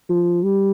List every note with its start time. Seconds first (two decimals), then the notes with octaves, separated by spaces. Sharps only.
0.09 F3
0.43 G3